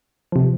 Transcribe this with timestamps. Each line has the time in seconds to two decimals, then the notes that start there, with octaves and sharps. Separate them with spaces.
0.32 C3 F3